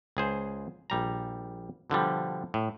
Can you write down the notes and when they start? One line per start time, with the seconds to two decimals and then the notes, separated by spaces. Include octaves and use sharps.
0.17 C#2 G#4 C5
0.90 A#1 G3 A#5
1.90 B2 D3 F3 G3
2.54 A2